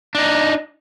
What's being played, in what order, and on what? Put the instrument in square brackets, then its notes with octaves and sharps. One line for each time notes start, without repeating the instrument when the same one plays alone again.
[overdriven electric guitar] D4 D#4